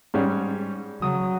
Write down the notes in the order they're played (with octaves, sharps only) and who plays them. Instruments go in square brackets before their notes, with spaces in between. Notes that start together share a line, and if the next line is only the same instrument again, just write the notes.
[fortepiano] G#2 G3 C#4
[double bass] C#3 F#3 [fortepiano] D#6